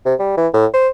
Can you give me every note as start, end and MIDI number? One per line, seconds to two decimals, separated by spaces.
0.05 0.14 48
0.19 0.34 55
0.37 0.48 52
0.53 0.66 45
0.73 0.88 72